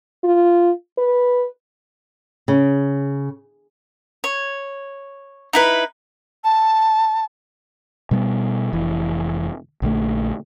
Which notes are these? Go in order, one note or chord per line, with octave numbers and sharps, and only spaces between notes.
F4
B4
C#3
C#5
D#4 E4 B4
A5
B2 G3 G#3 B3
F1 E3
A#1 D3 A3